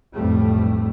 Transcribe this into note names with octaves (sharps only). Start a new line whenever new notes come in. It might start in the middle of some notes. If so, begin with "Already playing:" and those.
B1 F2 A2 G3 A3